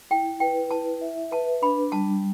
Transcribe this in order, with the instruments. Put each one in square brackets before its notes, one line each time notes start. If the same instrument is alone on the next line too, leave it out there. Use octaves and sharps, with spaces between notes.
[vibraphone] E4 [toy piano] G5
[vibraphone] B4 [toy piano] G5
[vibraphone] E4 [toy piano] A5
[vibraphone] E5
[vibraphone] B4 [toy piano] A5
[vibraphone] D4 [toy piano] B5
[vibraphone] G3 [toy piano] A5